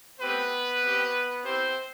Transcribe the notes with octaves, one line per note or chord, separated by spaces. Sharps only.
A3 B3 C4 G4 B4
C4 G4
B3 C4 E4 G4 C5